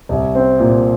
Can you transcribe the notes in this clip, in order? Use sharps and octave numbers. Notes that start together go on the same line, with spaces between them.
C2
C4
A#2